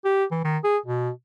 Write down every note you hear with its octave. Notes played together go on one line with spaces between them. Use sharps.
G4
E3
D#3
G#4
B2